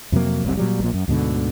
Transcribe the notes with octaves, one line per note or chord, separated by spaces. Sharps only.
F2 C3 F#3 A#3
F#1 C2 C3
A#2 F#3 G3
A#1 A#2
F#2
D2 G#2 B2 D3